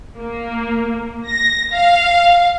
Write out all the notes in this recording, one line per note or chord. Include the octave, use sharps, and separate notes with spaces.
A#3
A#6
F5